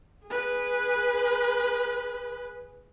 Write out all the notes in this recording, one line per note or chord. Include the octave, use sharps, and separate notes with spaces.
G#4 B4